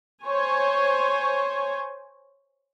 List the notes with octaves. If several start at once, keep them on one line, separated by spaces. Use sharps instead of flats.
C5 C#5 G#5